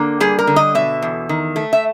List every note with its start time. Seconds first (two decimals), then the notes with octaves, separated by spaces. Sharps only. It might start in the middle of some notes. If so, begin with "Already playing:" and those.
Already playing: D3 A#3
0.20 G3 G#4
0.39 A#4
0.47 D3
0.56 D#5
0.75 B2 E5
1.02 E2
1.29 D#3
1.56 A3
1.73 E5